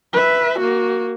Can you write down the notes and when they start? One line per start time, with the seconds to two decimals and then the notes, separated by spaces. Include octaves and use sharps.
0.13 B4 E5
0.59 A#3 F#4